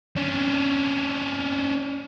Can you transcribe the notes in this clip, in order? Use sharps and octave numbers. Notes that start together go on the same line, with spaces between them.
C#4 D4